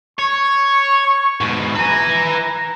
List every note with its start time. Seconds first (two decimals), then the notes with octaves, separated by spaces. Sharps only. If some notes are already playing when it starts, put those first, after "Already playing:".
0.19 C#5 C#6
1.41 G#2 B2
1.75 B4 G#5 A#5